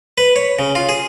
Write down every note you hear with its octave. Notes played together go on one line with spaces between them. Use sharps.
B4
C#5
C#3
F4
G#4